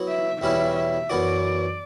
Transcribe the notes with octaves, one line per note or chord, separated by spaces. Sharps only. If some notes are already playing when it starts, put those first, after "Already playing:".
Already playing: F#3 B3 E4
E5
E2 B2 G3 C#4 E4 E5
E5
F#2 E3 B3 F#4 D5